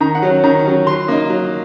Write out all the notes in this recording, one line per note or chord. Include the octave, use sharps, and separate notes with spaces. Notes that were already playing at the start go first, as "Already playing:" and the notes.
D#3 A#5
F#5
F#3 C#4
D#3 A#5
F#3 C#4
F#3 C6
A#3 D#4
F#3